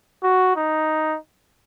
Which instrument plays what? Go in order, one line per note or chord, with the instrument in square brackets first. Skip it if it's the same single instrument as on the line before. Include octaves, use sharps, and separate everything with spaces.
[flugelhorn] F#4
D#4